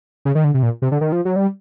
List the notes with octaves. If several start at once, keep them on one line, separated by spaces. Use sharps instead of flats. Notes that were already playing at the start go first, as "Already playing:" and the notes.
C#3
D#3
D3
C3
A#2
C3
D3
D#3
F3
F#3
G3